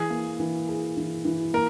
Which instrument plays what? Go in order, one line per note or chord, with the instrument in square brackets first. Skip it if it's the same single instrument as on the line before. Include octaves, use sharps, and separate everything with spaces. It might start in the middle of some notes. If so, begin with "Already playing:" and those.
Already playing: [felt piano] E3 [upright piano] G#4
[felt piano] A#3
E3
G#4
E3
E3
[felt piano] A#3 [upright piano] A#4